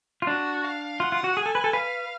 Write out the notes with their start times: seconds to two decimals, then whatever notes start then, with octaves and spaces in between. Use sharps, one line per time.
0.22 F4
0.27 D4 F#4
0.64 F5
1.00 F4 F#5
1.12 F4
1.24 F#4
1.37 G#4 G#5
1.46 A4
1.55 B4
1.64 A4
1.73 B4 F5